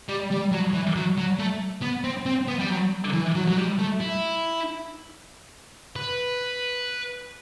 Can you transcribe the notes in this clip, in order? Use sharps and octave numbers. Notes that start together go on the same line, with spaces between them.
G3
G3
F#3
E3
F#3
F#3
A3
B3
C4
C4
B3
G3
F#3
E3
F#3
F#3
G3
A3
E4
B4